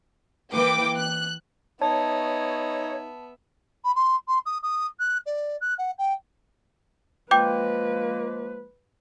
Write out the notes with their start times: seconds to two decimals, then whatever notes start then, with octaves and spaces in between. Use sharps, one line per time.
0.53 E3 A#3 B4 G5 D6
0.96 F#6
1.82 B3 D#4 C#5 E5 A5
3.84 B5
3.96 C6
4.28 C6
4.46 D#6
4.63 D#6
5.00 F#6
5.26 D5
5.61 F#6
5.78 F#5
5.98 G5
7.31 F3 G#3 A#3 B4 G5 D6 G6